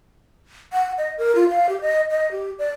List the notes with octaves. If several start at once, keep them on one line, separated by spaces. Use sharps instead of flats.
F#5
D#5
A#4
F4
F5
G4
D#5
D#5
G4
D5